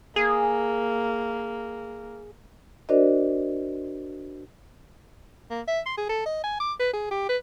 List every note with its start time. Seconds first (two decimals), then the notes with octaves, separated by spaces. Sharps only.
0.16 A#3 G#4
2.89 D4 F#4 A#4 C5 D5 D#5
5.50 A#3
5.68 E5
5.86 C6
5.97 G#4
6.09 A4
6.26 D#5
6.44 G#5
6.60 D6
6.80 B4
6.93 G#4
7.11 G4
7.29 B4